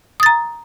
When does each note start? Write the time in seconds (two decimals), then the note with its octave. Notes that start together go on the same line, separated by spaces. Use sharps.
0.20 D#6
0.23 A6
0.26 A#5